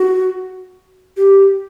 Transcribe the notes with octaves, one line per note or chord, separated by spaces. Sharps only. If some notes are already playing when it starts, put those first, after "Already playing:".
Already playing: F#4
G4